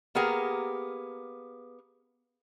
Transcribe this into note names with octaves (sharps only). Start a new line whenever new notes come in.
A#3 B3 G4 G#4 A#4